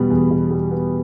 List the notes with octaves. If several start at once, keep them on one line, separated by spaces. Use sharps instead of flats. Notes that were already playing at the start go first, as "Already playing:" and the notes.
Already playing: E2 B2 G3 B3
E2
B2
G3
B3